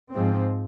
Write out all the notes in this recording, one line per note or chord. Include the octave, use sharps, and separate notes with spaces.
G#2 F3 C4